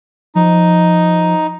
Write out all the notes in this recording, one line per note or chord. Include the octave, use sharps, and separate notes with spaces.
F3 D#4